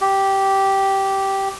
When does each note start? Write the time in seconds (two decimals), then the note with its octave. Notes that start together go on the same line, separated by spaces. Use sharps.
0.01 G4